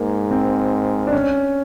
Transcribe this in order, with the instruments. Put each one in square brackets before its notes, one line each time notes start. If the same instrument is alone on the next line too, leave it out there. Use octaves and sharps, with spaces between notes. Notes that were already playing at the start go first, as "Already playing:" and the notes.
Already playing: [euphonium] G#2 [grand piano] A#3
[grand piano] C4
D4
C#4